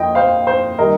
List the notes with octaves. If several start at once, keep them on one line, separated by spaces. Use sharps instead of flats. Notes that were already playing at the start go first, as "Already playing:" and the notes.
Already playing: F2 F3 D#5 G5
C5 F5
C5
D#3 G3 D#4 A#4 D#5